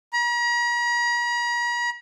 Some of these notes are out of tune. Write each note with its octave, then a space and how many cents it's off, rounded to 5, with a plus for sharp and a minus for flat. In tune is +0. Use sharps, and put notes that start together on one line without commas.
A#5 +45